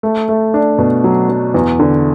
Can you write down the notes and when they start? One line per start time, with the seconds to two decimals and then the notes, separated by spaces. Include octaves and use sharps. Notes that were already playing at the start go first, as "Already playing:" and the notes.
0.03 A3
0.29 A3
0.54 D4
0.78 B2
1.04 F#3
1.29 F#3
1.54 E2
1.80 D3